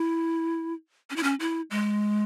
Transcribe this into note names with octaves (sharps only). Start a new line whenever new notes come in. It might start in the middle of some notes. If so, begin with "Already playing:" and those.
Already playing: E4
C#4
E4
C#4
E4
G#3